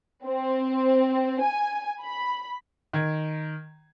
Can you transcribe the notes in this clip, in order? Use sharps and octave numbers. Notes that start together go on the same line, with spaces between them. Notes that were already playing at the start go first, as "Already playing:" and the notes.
C4
G#5
B5
D#3 G#6